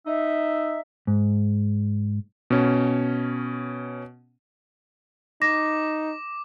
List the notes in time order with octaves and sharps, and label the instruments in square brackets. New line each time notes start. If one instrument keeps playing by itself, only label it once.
[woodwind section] D#4 E5
[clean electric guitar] G#2
[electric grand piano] B2 C#4
[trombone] D#4 [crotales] D6 [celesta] A#6